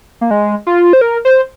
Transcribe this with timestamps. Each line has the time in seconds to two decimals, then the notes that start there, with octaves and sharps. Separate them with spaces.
0.21 A#3
0.31 G#3
0.67 F4
0.93 C5
1.01 A#4
1.25 C5